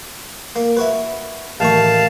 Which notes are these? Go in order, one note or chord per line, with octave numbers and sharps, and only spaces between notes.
A#3
E4 F#4 B4
A1 D#3 F5 A5 C#6